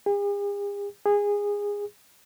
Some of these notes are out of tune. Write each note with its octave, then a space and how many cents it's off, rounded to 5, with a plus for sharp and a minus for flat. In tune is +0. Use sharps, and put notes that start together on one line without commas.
G#4 -45
G#4 -20